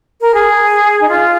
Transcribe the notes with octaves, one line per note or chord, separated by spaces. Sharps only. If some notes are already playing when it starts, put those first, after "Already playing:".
A#4
G#4
D#4
F4